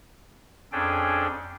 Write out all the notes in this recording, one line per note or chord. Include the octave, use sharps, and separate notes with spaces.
F2 C#4 D4 G#4 A4 G5